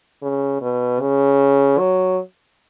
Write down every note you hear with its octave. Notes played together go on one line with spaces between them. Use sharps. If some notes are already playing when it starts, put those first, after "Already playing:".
C#3
B2
C#3
F#3